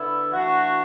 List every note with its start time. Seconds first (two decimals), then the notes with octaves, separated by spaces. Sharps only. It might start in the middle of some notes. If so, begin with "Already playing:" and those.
Already playing: D3 B3 E4
0.33 E3 A3 D4 F#4